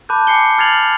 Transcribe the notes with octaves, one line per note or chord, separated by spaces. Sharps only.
A5 B5 D6 F#6 G6
G#5 D6 C7 C#7 G7
F6 G#6 A6 C7 F7 F#7